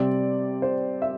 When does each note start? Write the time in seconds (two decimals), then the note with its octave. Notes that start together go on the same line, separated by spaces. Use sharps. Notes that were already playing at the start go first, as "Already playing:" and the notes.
Already playing: C3 G3 C4 D5
0.62 C5
1.02 E5